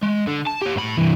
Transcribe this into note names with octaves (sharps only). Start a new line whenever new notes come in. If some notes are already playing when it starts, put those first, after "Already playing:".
G#3
D3
A5
G4 C#5
A2 B5
C2 E3